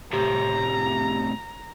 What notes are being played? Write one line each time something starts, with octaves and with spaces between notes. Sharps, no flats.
A2 C3 G4 A#5